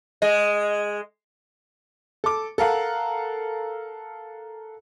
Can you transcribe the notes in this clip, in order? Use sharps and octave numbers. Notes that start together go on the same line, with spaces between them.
G#3 D#5
A4 D6
A4 A#4 F5 F#5